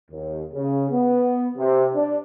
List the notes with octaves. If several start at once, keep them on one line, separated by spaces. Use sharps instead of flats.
D#2
C#3
B3
C3
D4